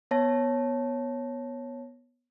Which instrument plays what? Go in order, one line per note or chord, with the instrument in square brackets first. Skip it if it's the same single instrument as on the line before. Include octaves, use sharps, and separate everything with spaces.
[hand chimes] B3 C#5 A5 A#6